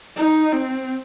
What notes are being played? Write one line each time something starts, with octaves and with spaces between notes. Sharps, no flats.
D#4
C4